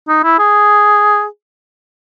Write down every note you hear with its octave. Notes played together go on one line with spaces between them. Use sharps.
D#4
E4
G#4